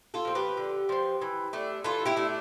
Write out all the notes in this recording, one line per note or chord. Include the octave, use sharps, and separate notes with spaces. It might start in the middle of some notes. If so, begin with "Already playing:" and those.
F4 A4
F3 C4
G4 B4
D3
F3 C4
E3
A3 D4
E3 F4 A4
E4 G4
A3 D4